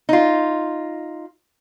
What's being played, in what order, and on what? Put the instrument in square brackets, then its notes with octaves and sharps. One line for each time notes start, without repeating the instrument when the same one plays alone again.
[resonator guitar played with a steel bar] D#4 F4